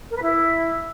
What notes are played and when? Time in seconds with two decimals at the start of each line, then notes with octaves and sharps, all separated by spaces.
0.11 A#4
0.17 B4
0.22 E4